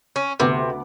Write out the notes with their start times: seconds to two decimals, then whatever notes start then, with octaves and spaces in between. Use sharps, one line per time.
0.16 C#4
0.40 D2 C3 B3 D6